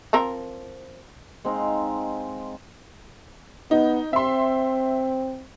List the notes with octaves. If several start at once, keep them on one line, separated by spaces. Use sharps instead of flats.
F3 C4 A#4
G#3 C4 D#4 F5
B3 D#4
C4 E5 C6